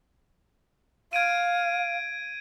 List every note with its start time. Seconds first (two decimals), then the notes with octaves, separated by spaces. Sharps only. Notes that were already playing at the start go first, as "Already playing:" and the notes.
1.13 F5 G#6 D7 D#7